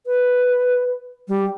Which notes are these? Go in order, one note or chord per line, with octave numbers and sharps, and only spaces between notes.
B4
G3